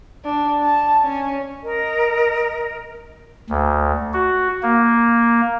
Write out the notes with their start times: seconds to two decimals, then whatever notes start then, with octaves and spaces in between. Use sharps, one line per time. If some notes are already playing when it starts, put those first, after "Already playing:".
0.24 D4
0.63 A5
1.05 C#4
1.63 A#4 D#5
3.50 D2
4.13 F#4
4.63 A#3